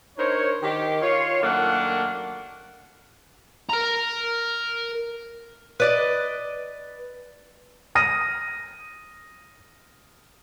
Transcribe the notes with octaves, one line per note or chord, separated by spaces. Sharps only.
D4 D#4 A#4 C5 C#5
D#3 G4
F4 C#5
F#2 D#3 A3 A#3 D4 F#5
A#4 A#5
B4 D5 D#5
D#6 F6 A#6 D#7